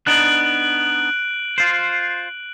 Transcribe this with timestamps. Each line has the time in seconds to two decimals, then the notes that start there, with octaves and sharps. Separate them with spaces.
0.07 B3 D4 D#4 F#6 D7 F#7
1.58 F4 C5